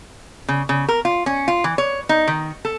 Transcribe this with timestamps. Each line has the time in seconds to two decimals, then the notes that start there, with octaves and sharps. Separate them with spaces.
0.48 C#3
0.69 C#3
0.88 A#4
1.05 F4
1.26 C#4
1.48 F4
1.64 E3
1.78 C#5
2.09 D#4
2.28 D#3
2.65 A4